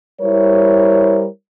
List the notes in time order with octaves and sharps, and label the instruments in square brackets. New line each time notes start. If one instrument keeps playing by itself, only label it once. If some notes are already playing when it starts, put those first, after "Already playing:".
[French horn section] G3 E4 A#4 C5 C#5